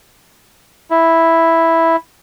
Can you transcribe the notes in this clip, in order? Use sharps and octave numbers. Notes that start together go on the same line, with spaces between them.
E4